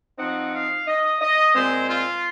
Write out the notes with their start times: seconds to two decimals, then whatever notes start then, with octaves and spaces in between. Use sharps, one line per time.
0.18 F3 C4 D#4 F#5
0.53 F5
0.87 D#5
1.21 D#5
1.54 A#2 G#3 C4 C5
1.89 F4